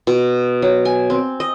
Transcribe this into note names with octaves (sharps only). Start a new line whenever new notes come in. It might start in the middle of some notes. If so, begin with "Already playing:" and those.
B2
F#3
G#5
C4
D#5